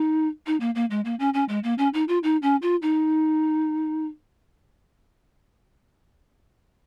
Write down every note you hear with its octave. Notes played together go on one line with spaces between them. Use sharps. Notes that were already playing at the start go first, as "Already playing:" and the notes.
Already playing: D#4
D#4
A#3
A#3
G#3
A#3
C#4
C#4
G#3
A#3
C#4
D#4
F4
D#4
C#4
F4
D#4